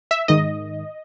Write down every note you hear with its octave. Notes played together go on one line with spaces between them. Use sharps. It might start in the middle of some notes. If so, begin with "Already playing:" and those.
E5
G#2 D#3 D#5